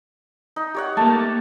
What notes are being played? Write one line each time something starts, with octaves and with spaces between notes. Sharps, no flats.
D#4
G4 C#5 F#5
A3 A#3 A5